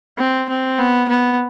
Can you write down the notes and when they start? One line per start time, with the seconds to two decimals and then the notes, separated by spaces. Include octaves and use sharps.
0.19 C4
0.49 C4
0.79 B3
1.09 B3